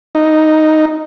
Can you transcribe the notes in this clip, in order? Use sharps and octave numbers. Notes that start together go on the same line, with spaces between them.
D#4